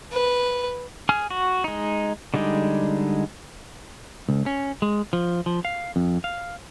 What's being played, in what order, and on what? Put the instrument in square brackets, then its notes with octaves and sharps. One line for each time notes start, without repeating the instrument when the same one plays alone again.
[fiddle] B4
[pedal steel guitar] G#4 G#5 F6
F#4
G#3 D#4
D3 G3 G#3 D#4
[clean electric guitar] C#2
C#4
G#3
F3
F3
F5
F2
F5